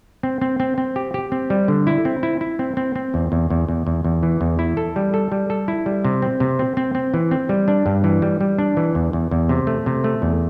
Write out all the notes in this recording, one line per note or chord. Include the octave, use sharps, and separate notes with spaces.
C4
C4
C4
C4
G4
G4
C4
G3
D3
E4
C4
E4
E4
C4
C4
C4
E2
E2
E2
E2
E2
E2
E3
E2
E4
A4
G3
A4
G3
A4
E4
G3
C3
C4
C3
C4
C4
C4
E3
C4
G3
D4
G2
E3
G3
G3
D4
E3
E2
E2
E2
C3
A3
C3
A3
E2